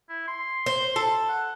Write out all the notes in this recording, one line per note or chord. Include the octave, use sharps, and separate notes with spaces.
E4
C6
C5
A4
F#5